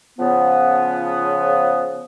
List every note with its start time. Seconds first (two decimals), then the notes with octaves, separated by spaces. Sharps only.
0.19 C#3 F3 B3